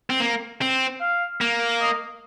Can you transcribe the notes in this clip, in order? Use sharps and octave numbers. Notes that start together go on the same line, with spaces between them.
C4
A#3
C4
F5
A#3
D#5